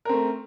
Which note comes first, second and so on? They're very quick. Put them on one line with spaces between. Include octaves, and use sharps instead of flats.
A#4 C4 A3